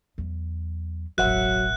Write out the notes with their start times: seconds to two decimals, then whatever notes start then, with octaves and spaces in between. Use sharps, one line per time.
0.18 E2 F#3
1.18 E1 A1 F#3 A#4 E5 F#5 F#6